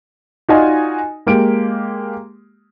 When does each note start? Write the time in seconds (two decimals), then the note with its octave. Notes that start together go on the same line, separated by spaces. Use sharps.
0.49 D#4 F4 F#4 D5 D#5 G#5
1.26 G#3 A#3 G4 D7